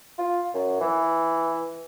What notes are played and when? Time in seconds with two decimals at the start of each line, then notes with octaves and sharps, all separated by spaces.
0.18 F4
0.54 F#2
0.81 E3